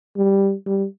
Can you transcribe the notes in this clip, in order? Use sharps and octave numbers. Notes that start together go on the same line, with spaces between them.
G3
G3